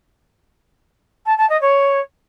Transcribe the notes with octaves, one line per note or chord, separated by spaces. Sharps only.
A5
A5
D#5
C#5